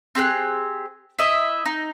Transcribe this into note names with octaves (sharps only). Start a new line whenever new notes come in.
C4 G4 G#4 F#6
E4 D#5 E5
D#4